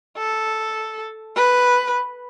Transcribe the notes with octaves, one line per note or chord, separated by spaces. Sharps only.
A4
B4